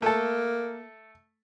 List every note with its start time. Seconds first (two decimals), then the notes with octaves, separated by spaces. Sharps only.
0.02 A3 A#3 A4